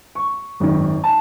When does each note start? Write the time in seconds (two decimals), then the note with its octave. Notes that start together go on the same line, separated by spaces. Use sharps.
0.15 C#6
0.60 G#1 F#2 D#3
1.04 A5